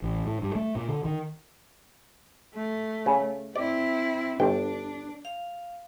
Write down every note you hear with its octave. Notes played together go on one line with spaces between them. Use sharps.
A1
A2
G2
A3
A#2
D3
D#3
A3
C#3
C4 E4 D5
G1 D4 G5
F5